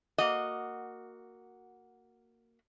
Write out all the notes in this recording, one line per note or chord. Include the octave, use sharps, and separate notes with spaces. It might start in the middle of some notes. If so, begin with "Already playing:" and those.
A#3 F#4 D#5